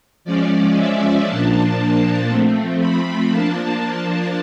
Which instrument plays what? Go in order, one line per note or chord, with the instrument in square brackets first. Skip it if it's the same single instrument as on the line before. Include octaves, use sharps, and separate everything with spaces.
[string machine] F3 G#3 C#4 D5
E5
A#2 F3 A#3 D4 A5
A5
F3 A3 C4
B5
F3 A#3 D4 A5